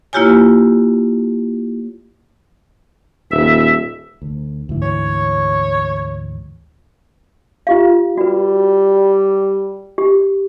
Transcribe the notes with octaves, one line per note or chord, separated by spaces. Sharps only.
A#3 E4 F4 G4 C#5 G#5
D#1 E5
D2
D2 G#2 E3
C#5
F4 G4 F5
G3 F#4 B4
G4